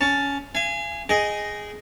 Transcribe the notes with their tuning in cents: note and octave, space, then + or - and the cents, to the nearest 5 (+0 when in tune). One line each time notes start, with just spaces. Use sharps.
C#4 +15 A5 +0
F5 -40 G#5 +0
G#4 +0 D#5 +0 G5 -30